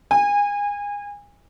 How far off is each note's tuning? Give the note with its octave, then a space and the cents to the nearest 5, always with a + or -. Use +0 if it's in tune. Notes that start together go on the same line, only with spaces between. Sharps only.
G#5 -25